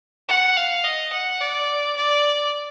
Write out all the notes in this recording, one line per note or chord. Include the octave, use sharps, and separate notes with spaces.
F#5
F5
D#5
F#5
D5
D5